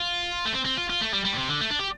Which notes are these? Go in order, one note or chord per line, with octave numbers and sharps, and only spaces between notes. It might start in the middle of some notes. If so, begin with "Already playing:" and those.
Already playing: F4
A3
C4
C4
F4
F4
A3
G3
G3
A2
C3
D3
A3
D4
G4